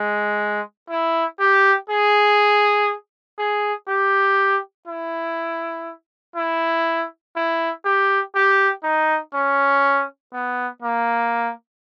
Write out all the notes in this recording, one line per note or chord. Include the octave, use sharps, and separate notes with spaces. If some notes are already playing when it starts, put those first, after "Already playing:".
Already playing: G#3
E4
G4
G#4
G#4
G4
E4
E4
E4
G4
G4
D#4
C#4
B3
A#3